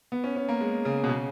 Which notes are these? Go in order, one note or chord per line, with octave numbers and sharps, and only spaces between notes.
B3
C#4
C#4
A#3
G#3
C#3
B2
C#3